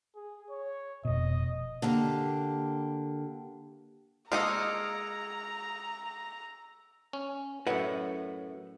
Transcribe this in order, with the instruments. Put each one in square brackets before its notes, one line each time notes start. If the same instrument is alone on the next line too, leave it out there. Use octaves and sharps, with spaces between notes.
[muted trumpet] G#4
C#5
[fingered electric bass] F1 B2 [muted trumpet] D#5
[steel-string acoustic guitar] D3 A#3 G4
[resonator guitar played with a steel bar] G#3 [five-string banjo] A#3 D#4 F4 [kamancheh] A#5 [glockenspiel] E6 C#7 D7
[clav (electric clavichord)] C#4
[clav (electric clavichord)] F#2 A2 [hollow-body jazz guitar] B4 E5 F#5